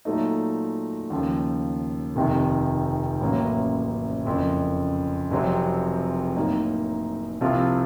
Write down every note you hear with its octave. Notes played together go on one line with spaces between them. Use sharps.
A#2 F#3 A3 D#4
D#2 C#3 F3
F1 F2 C3 D#3
A1 A2 F#3 A#3 C#4
F#1 F2 C#3
F1 F2 C3 F#3 C4
A2 F#3 A#3 D#4
C2 C3 F3 C4 F4